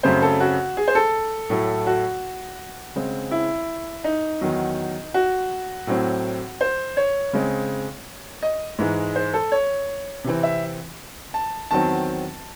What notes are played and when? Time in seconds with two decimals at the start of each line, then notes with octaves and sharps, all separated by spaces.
0.03 F#2 C#3 F#3 A3 C4 C5
0.22 A4
0.40 F#4
0.77 G#4
0.88 C5
0.95 A4
1.50 A2 F#3 A3
1.86 F#4
2.96 C#3 G#3 C4
3.31 E4
4.04 D#4
4.41 E2 D#3 F#3
5.14 F#4
5.87 A2 F#3 C4
6.61 C5
6.97 C#5
7.33 C#3 G#3 C4
8.42 D#5
8.78 G#2 E3 G#3
9.16 C5
9.34 A4
9.52 C#5
10.24 C3 E3 C4
10.43 E5
11.34 A5
11.71 E2 D#3 F#3 C4 A5